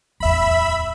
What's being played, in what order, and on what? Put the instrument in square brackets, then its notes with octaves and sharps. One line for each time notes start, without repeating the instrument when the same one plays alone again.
[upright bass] D1 E2 [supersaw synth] E5 B5